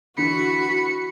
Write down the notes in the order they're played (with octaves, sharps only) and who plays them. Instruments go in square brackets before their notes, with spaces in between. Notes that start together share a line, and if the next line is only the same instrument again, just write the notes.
[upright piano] D3 E3 [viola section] F#4 [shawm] B5 [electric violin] C#7